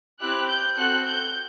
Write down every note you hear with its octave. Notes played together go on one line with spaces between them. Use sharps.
C4 E4 G4 F#6
G6
C4 F#4 A4 F#6
G6